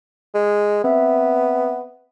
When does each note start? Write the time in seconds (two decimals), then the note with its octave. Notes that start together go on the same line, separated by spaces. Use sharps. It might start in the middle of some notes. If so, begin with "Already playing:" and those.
0.34 G#3
0.84 B3 C4 E5